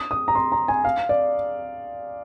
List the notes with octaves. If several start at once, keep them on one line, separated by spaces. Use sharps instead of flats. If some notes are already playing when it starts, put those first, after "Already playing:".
Already playing: D#6
D#6
A#5
C6
A#5
G#5
F5
D5